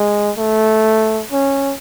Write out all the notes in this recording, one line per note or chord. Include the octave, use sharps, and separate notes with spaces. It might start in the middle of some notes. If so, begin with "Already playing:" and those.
Already playing: G#3
A3
C#4